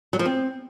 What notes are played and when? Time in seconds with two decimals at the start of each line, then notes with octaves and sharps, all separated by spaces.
0.13 F#3
0.19 F3
0.26 C4